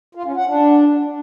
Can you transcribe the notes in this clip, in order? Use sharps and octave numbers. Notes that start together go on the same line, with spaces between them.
F4
C#4
F#5
D4